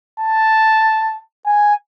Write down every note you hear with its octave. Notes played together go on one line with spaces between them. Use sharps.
A5
G#5